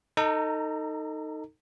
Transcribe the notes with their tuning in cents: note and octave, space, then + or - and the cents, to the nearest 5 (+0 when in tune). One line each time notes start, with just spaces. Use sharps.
D#4 +0 A4 +30 A#5 -15